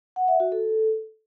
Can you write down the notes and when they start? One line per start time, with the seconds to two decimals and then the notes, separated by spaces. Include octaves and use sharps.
0.16 F#5
0.28 E5
0.40 F#4
0.52 A4